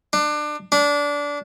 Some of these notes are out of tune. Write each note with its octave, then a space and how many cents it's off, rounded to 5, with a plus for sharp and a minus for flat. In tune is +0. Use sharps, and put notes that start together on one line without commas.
D4 +25
D4 -20